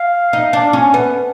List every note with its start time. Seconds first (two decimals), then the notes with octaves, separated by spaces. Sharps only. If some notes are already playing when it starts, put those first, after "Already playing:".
Already playing: F5
0.33 D#4
0.53 D4
0.73 C#4
0.94 B3